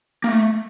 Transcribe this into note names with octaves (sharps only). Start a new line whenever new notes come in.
A#3
A3